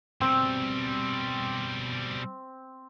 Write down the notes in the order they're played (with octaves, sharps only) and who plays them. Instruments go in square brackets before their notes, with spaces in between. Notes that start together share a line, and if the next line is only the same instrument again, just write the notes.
[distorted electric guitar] B2 G3 [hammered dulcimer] C4